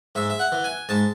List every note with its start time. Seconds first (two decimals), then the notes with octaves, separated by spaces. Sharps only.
0.15 G#2 E5
0.30 E5
0.39 F#5
0.52 E3
0.64 G#5
0.89 G#2 A5